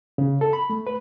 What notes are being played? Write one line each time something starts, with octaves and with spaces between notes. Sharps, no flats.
C#3
A4
B5
A3
B4